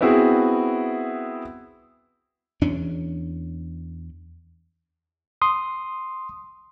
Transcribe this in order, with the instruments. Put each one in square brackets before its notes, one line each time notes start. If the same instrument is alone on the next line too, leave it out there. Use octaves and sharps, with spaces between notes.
[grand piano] B3 C4 E4 F#4 G#4
[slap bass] E2 C#4 D4
[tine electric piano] C6 D#6